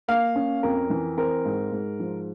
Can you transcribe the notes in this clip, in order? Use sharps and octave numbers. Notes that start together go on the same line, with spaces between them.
A#3 F5
C#4
F2 A#4
E3
C4 A#4
G#2
G#2
F3